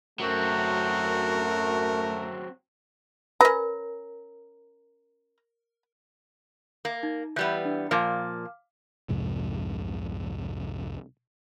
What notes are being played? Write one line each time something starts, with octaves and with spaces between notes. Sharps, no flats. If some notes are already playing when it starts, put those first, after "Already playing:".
F#2 F#3 A3 C4 F#4 A#4
C#4 A#4 B4 A#5
A#3
D#4
E3 G3 B3 F#6 G6
D4
A#2 F3 A#3 F5 D6 F6
C2 F2 G#2 C3